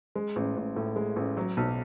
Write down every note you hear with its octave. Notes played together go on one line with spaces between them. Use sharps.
G#3
A1
A1
A2
G#3
A1
F#3
B1